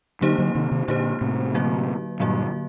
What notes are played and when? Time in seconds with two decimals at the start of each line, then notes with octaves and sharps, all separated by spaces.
0.21 D3 F#3 A#3 D#4 G4 C5
0.38 D3 F#3
0.55 C3 D#3
0.71 C3 D#3
0.88 A#2 D3 A#3 D#4 G4 C5
1.21 A2 C3
1.54 D3 F#3 A#3 F#4
2.20 G2 A#2 D3 F#3 A#3 F#4